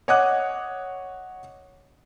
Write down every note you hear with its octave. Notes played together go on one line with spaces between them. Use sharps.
C#5 D#5 F#5 D6 D#6 F#6